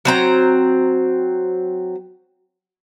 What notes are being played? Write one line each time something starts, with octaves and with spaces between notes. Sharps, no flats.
F#3 C4 A#5